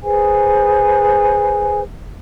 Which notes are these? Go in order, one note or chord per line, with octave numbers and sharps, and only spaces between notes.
G#4 B4 C5 G#5